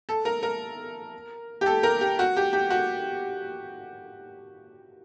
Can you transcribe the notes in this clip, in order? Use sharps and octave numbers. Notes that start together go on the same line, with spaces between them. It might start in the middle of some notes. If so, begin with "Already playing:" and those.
A4
A#4
A#4
G4
A4
A#4
G4
F#4
G4
G4
F#4